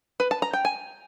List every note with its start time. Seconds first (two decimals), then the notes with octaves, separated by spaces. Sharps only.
0.20 B4
0.31 A5
0.42 A#5
0.53 G5
0.65 G#5